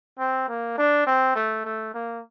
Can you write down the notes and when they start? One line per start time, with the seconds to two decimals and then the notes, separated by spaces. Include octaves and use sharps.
0.19 C4
0.48 A#3
0.78 D4
1.07 C4
1.35 A3
1.65 A3
1.94 A#3